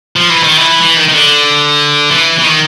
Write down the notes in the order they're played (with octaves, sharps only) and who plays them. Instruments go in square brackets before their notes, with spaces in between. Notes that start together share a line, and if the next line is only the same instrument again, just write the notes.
[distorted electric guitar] F3
E3
D#3
E3
E3
D#3
D#3
D3
E3
E3
D#3